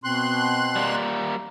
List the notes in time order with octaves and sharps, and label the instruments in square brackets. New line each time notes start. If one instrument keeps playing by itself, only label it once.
[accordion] B2 C6 F#6 [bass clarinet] C4
[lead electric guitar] G3 A#3